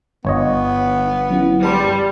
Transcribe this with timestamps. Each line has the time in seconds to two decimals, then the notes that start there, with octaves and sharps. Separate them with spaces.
0.25 G1 B3 C#5 D#5
1.30 F#3 C#4 E4
1.63 G3 B4 A5 C6